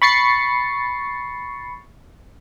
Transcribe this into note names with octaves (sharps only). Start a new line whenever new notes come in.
B5 C#6 A6 C7 C#7